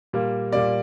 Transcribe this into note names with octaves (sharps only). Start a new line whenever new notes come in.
A#2 G3 A#3
A#2 G3 A#3 D5